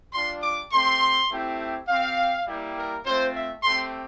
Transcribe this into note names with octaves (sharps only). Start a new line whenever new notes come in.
G3 D4 F4 C6
D6
A3 C4 G4 C6
A3 C4 E4 G4
C4 G4 F5
G3 A#3 E4 G4
A#4
A3 C4 F4 C5
E5
A3 C4 G4 C6